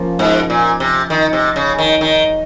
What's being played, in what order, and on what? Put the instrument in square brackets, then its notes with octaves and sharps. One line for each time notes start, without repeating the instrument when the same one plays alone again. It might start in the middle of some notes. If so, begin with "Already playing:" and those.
Already playing: [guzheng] F3 A#3 C#4
[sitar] G#2
A#2
C3
D#3
C3
C#3
D#3
D#3